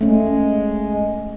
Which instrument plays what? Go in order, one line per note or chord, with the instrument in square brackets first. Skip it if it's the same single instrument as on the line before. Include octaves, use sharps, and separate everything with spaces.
[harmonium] G#3 [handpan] A3 C#4